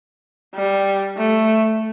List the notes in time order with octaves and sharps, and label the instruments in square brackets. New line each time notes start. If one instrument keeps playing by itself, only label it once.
[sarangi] G3
A3